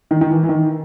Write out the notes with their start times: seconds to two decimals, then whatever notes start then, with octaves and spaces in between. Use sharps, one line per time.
0.11 D#3
0.21 D#3
0.30 E3
0.43 E3
0.49 D#3